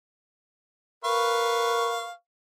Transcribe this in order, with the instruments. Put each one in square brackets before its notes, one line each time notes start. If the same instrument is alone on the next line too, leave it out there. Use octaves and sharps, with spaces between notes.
[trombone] A#4 [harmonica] B4 F5 C#6